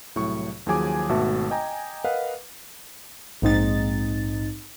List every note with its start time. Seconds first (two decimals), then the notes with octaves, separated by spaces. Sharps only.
0.15 C2 A2 F#3 C#6
0.66 D#2 F3 F#3 G#4 G#5 D6
1.09 G#1 B2 A3 F#4 E5 A5
1.51 D#5 G5 G#5 A#5
2.04 A#4 B4 D#5 F5 F#5
3.42 A#1 G#2 C4 D#4 A6